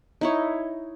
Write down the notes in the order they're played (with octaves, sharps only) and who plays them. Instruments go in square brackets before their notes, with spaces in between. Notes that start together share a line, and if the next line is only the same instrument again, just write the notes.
[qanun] D#4 E4 C#5